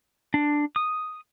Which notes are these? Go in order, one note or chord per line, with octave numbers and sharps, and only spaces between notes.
D4
D#6